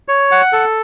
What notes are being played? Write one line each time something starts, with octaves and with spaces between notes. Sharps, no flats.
C#5
F#5
A4